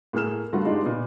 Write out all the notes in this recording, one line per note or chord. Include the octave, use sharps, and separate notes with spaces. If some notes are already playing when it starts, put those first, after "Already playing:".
A2 A#3 G#4 F6 E7
G2 A3 F4 F#4
G#3 D4 D#4 F4 G4
A#2 B3